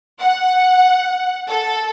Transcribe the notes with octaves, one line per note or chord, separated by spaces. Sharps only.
F#5
A4